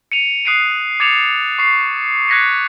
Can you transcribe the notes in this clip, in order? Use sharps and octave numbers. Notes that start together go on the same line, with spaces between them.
C#7 D#7 F7
D#6 F#6 C7 D7 D#7
D6 G#6 A6 C#7 E7 F7
C#6 C7
F#6 G#6 A#6 B6 C#7 D#7